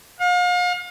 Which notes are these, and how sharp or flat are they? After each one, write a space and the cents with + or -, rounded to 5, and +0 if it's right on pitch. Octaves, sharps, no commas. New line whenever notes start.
F5 +40